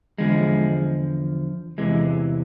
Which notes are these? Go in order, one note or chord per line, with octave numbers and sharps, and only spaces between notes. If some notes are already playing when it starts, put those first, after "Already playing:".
E2 D3 F3 G#3
E2 C3 E3 G#3